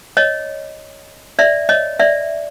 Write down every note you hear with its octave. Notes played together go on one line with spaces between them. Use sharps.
C#5 D#5
D5 E5
C#5 D#5
D5 E5